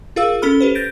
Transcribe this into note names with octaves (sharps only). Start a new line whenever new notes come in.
F4 G#4 A#4 F5 E6
C#4 A4 B5 F6
G4 B4 C5
G6 A6 A#6 D7